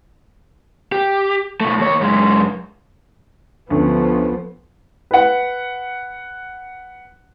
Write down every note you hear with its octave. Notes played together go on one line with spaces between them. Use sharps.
G4
B2 A3
D#2 C#5
F#2 G#3
D2 D3 F3 B3 C#4
B4 F#5